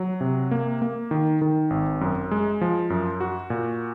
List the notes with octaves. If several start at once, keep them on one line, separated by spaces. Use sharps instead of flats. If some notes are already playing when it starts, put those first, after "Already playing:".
Already playing: F#3
C3
A#3
A#3
D#3
D#3
G#1
F#2
G#3
F3
F#2
F#4
A#2